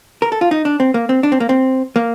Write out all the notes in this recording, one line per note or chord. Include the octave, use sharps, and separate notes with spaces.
A#4
A4
F4
D#4
D4
C4
A#3
C4
D4
C4
A#3
C4
A#3